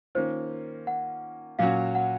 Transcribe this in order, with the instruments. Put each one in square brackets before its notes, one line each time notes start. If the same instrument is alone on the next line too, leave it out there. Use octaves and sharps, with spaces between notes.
[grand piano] D#3 A#3 C#4 F4 [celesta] C5
[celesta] F#5
[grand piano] A#2 F#3 C#4 F#4 [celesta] F5
[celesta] F#5